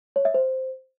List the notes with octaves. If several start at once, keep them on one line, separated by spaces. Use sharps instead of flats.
C#5
E5
C5